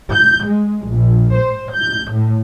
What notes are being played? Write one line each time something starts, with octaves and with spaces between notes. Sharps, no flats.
G6
G#3
A#1
C5
G6
A2